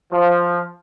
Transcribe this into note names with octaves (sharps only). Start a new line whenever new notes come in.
F3